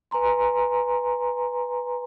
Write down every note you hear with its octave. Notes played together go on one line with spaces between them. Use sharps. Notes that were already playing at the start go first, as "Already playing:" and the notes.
B4 G#5 A#5 C6